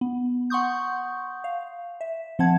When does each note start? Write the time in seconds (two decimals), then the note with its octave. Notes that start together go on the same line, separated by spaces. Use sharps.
0.01 B3
0.50 F#5 C6 C#6 D#6 G6
1.44 F5
2.01 E5
2.39 F3 C4 F#5 A5 G#6